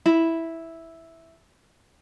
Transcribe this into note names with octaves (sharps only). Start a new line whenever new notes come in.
E4 B5